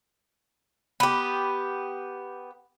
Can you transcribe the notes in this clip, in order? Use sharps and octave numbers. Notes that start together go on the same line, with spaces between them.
B3 G4